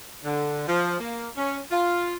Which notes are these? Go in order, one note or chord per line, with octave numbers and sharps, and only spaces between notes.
D3
F3
A#3
C#4
F4